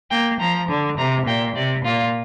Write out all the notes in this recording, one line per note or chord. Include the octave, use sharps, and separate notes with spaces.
A#3 G5
F3 A#5
D3
C3 A#5
A#2 G5
C3 D5
A#2 F4